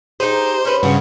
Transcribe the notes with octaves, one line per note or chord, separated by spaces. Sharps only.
D#4 G4 G#4 C5
C#4 B4
G2 C#3 F#4